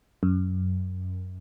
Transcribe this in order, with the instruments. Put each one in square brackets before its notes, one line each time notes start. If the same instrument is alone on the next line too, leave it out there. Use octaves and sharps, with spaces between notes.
[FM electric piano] F#2